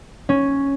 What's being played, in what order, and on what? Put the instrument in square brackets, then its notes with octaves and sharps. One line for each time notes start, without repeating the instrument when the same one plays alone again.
[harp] C#4